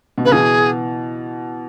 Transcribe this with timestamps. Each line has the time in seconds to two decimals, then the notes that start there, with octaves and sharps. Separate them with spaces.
0.18 B2
0.25 C#3 B4
0.32 B2 E3 G#4